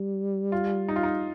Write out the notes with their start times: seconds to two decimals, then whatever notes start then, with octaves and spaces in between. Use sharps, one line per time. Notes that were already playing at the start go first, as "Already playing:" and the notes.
Already playing: G3
0.52 F4
0.88 D#4
0.96 F4
1.03 D#4